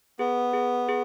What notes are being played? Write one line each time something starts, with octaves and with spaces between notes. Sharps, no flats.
B3 G#4
G#4
G#4